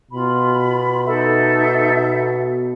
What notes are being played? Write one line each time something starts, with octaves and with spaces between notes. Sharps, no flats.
B2 F4 B5
D#4 A4 E5